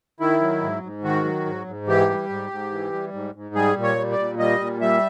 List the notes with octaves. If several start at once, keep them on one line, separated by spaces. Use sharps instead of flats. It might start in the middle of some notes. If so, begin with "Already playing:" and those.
D#3 E4
F#3
G#2
G#2
D#3 F#4
F#3
G#2
G#2
E3 G4
G3
G#2
G#2
E3
G3
G#2
G#2
G3 G#4
A#2
C#5
G3
D5
A#2
G3 D#5
A#2
G3 E5